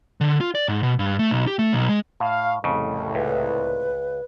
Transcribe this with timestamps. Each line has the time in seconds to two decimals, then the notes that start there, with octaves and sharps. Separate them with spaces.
0.21 D3
0.41 F4
0.55 D5
0.68 G#2
0.83 B2
0.99 G2
1.19 A3
1.31 B1
1.47 G4
1.59 A3
1.73 B1
1.89 G#3
2.20 A2 F5
2.64 C2 F2 A2 C#3
3.15 C#2 B4